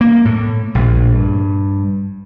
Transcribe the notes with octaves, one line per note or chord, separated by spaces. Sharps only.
A#3
A2
A#1
G2